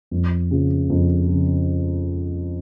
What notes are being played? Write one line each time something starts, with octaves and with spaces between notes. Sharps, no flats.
F2
C#3 F3
F2
C#3 F3